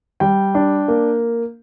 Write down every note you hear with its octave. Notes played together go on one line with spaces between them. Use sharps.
G3 G5
D4
A#3